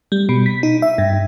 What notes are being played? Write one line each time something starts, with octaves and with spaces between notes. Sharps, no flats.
G3
B2
B6
D#4
E5
G2